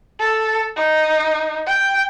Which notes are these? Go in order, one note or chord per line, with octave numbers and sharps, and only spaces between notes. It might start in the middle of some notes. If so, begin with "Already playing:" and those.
A4
D#4
G5